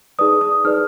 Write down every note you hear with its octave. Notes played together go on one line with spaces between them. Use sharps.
D#4 G#4 B4 D5 D#6
D#6
D#4 G#4 B4 D5 F6